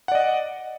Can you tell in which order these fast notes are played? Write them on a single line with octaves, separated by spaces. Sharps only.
F#5 D5 D#5